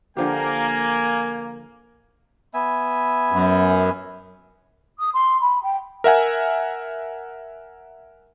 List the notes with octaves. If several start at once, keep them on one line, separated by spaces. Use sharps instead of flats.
D3 F3 A#3 G4 G#5
B3 E5 G#5
F#2
D#6
C6
B5
G5
A#4 E5 F#5 G#5